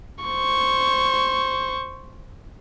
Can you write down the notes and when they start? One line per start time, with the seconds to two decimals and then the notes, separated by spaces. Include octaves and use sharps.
0.24 C5 C#6